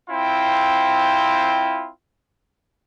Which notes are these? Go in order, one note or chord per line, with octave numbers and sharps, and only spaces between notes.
C4 E4 F4 G5